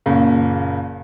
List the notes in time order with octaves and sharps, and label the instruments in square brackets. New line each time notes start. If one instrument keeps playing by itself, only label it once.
[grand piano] F#1 A#2 C#3